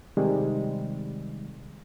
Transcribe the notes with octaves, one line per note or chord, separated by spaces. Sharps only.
C3 D#3 G3 G#3